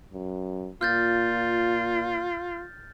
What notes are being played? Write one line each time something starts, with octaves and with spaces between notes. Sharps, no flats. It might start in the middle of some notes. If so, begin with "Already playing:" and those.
F#2
A#2 F4 F6 G6 A6